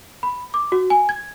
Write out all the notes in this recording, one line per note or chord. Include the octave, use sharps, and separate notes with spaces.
B5
D6
F#4
G#5
G#6